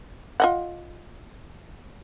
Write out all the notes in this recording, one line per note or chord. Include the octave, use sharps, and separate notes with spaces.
F4 D#5 F#5